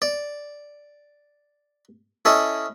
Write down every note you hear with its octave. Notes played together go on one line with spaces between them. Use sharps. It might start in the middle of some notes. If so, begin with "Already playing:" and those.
D5
C#4 E4 A4 D#5